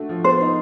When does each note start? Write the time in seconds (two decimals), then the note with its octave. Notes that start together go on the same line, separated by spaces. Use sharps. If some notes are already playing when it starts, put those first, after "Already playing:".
Already playing: A3 D4 F#4
0.09 F3
0.24 B3 C5
0.41 D#4